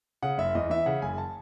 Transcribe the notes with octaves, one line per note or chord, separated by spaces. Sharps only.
C#3 F#5
F#1 E5
E2 D#5
E3 E5
C#3 F#5
F#1 G#5
A5